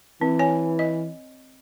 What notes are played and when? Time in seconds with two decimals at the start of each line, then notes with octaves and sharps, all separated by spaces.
0.21 E3 C4
0.39 C#5 G#5
0.79 D#5